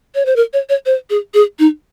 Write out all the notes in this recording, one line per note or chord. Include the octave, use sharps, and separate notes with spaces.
C#5
C5
A#4
C#5
C#5
C5
G#4
G#4
D#4